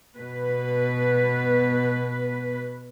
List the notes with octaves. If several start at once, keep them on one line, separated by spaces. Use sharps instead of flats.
B2 B4